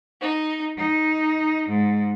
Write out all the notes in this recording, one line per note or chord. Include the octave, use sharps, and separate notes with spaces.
D#4
D#4
G#2